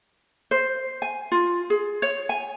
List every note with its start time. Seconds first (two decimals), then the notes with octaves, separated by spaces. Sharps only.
0.51 C5
1.02 G#5
1.32 F4
1.70 G#4
2.02 C#5
2.29 G#5